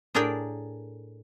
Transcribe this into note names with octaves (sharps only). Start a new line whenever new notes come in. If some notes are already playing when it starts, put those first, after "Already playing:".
A2 D4 G#4 A#4 D5 G5